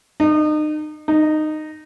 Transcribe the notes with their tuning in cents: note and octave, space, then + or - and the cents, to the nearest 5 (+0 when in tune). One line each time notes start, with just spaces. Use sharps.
D#4 -35
D#4 -15